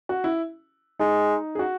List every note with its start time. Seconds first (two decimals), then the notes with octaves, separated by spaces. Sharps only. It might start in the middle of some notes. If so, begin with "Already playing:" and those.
0.09 F#4
0.24 E4
0.99 G#3 D#4
1.55 G#4
1.59 F#4